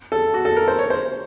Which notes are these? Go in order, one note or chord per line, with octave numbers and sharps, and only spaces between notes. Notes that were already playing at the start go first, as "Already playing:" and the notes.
A4
F#4
A4
A#4
C5
C#5
C5